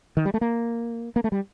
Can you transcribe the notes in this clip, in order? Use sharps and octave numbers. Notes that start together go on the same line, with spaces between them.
D#3
G3
A3
A#3
A#3
A3
G3